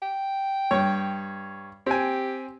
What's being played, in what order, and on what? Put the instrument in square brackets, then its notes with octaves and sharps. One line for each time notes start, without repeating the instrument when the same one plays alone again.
[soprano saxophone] G5
[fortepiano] G2 C#5
[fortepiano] C4 G#5 [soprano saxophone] G4